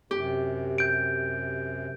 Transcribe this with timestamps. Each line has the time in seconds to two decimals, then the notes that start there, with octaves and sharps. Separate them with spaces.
0.11 F#2 C3 G4
0.78 G6 D7